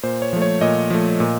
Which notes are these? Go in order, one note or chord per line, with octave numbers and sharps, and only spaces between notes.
A#2 C5
C#5
F3 A3
C#5
A#2 D#5
F3 A3
A#2